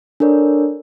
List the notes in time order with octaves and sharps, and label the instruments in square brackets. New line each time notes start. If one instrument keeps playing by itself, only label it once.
[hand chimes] D4 A4 A#4 C#5 D5